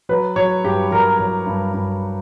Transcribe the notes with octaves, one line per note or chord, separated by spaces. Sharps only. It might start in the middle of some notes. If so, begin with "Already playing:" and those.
F#3 B4
F#3 C#5
G2 G4
F#3 A#4
F#3
G2
G2